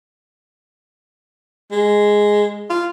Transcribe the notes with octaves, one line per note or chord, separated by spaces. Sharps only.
G#3
F4